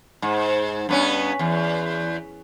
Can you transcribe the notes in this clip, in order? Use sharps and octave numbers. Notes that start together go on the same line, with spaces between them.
G#2
G2 B3 C#4
E2